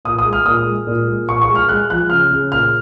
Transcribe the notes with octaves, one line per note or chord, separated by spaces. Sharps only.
A#2 D#6
D#6
G#3
F6
A#2 D#6
G#3
A#2
G#3
A#2 C#6
C#6
G#3
F6
G#3 F#6
F3 F#6
C#3 F6
C#3
A#2 F6